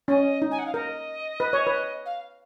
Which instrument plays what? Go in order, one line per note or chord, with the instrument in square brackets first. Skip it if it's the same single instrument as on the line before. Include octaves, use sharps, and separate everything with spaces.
[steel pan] C#4 [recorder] D#5
[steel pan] D#4
[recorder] G#5
F#5
F5
[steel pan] A#4 [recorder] D#5
[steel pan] B4
C#5
B4
[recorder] F5